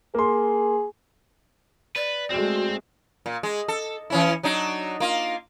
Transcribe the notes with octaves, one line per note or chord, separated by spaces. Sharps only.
A#3 G#4 C6
B4 D5
G#3 A3 C4 F#4
A#2
G#3
A4
E3 C#4 E4
F#3 D4 D#4
A#3 F4